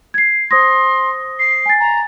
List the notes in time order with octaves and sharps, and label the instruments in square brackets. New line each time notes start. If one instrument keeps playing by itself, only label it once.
[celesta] G#6 C7
[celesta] C5 D#6 A#6 [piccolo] C6
[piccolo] C7
[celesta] G#5 A6
[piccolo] A#5